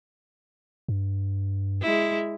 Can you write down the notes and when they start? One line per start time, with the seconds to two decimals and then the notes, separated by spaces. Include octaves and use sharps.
0.88 G2
1.82 G#3 E4